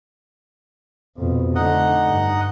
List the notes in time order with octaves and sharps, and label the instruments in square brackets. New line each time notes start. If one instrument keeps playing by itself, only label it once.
[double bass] F2 B2
[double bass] D3 A3 [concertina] D#4 D#5 F#5
[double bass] G2